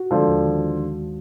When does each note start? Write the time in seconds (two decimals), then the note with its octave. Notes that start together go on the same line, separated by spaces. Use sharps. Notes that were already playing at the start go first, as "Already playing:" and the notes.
Already playing: F#4
0.11 D3 F3 G#3
0.28 D#2
0.45 D#3